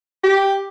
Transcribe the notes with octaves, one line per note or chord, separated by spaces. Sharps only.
G4